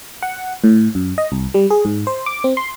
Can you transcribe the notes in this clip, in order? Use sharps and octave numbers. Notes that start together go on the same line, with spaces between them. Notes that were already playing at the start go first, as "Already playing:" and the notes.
F#5
A2
F#2
D#5
C2
G3
G#4
G#2
C5
D6
C4
C6